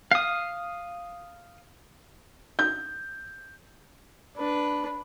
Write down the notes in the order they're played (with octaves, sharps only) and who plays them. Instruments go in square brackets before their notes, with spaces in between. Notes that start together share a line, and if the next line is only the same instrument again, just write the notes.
[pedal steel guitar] F5 D#6
[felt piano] G6
[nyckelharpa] D4 B4